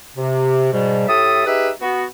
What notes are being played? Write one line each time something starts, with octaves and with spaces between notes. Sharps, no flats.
C3
G#2 B2 G3
A2 G4 A4 E5 D#6
D#4 G4 G#4 B4 E5
B3 F#4